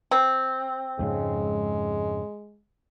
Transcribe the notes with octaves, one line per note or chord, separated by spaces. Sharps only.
C4
F2 G#2 C#3 G#3